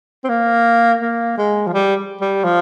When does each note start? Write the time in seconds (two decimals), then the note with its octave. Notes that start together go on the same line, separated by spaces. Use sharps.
0.24 C4
0.29 A#3
1.01 A#3
1.38 G#3
1.67 F3
1.73 G3
2.21 G3
2.44 F3